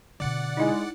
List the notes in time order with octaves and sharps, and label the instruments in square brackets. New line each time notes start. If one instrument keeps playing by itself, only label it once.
[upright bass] B2 D3 [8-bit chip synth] D5 F#5
[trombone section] G#3 [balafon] D#4 E4